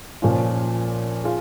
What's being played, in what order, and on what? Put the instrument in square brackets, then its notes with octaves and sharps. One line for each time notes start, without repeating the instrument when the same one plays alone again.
[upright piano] A#2 F3 C#4 F4
F4 G#4